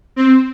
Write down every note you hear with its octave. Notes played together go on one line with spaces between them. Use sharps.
C4